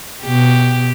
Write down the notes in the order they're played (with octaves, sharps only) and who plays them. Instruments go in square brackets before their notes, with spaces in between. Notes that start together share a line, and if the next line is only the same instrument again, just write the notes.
[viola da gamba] B2 G4